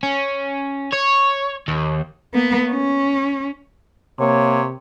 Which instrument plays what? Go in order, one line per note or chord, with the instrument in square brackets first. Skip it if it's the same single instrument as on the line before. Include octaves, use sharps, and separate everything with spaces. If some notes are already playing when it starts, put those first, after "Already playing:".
[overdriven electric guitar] C#4
C#5
D#2
[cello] A#3 B3
C#4
[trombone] C3 [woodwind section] A#3 C#5